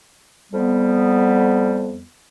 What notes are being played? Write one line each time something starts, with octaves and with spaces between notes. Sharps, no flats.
F2 G3 B3